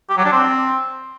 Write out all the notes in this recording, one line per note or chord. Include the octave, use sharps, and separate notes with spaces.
G4
F#3
D4
C4